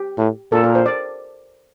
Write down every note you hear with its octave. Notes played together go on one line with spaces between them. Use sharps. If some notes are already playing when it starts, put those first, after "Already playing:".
Already playing: G4
A2
A#2 A4
A#4
C5
D5